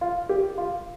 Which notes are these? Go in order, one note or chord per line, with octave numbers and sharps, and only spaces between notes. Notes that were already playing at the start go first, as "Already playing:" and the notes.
F4
G4
F4